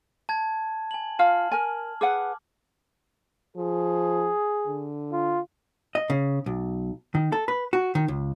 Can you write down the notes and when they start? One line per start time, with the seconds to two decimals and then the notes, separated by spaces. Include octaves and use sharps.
0.29 A5 G#6
0.91 G#5 F#7
1.19 F4 F5 A5 F6
1.51 A#4 G#5
2.01 G#4 B4 F#5 D6
3.57 F3 G#4
4.67 D3
5.13 F4
5.95 D#5
6.10 C#3
6.46 B1
7.15 D#3
7.32 A4
7.48 B4
7.73 F#4
7.95 D#3
8.08 C#2